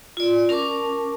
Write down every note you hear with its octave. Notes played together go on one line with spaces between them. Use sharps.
F4 D5
C#4 A#4 A5 C#6 D6